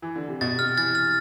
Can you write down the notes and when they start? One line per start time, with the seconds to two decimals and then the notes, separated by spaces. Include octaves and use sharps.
0.02 E3
0.16 D3
0.28 C3
0.41 B2 A6
0.59 C3 F6
0.77 E3 A6
0.95 F6